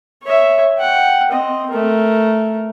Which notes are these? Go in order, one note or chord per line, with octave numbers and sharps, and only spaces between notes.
C#5 E5
F#5 G5
C4 D#5
A3 A#4